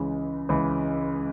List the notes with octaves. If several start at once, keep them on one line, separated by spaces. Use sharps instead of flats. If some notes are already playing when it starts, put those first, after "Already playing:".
Already playing: C#2 C#3 E3
C#2 C#3 E3